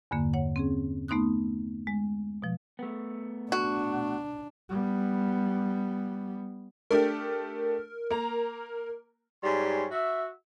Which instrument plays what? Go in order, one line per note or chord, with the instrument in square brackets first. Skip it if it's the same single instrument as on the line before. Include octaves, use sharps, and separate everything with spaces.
[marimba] E2 G2 D3 A#3
C#5 F#5
C4 C#4 G#4
A3 B3 D#4 C6 D#6 F#6
G#3
B2 F3
[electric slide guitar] A3 B3
[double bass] D4 [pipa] F#4
[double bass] G3 B3
[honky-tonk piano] A3 D4 G4 [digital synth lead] A#4
[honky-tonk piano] A#3 A#5
[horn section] G#2 G3 C#4 C6
F#4 E5